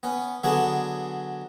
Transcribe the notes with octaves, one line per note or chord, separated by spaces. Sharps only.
B3 C#4
D3 F#3 B3 D4 G#4 C#6